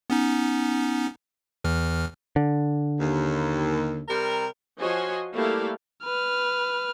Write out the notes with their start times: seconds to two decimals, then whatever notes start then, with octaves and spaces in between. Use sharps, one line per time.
0.10 B3 C#4 D#4
1.64 E2 E3 F6
2.36 D3
2.99 D#2
4.08 C3 G3 A#4
4.79 F3 F#4 C#5 D#5 G#5 C6
5.32 G3 A3 A#3 E4 G4 F5
6.05 B4 F6